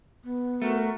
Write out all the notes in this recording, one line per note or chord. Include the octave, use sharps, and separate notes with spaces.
B3
A3 F#4 A#4